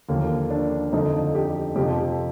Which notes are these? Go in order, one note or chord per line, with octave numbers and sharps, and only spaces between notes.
D#2 D3 F3 A#3
D4
F2 D3 F3 D#4
G4
F2 C3 F3 G4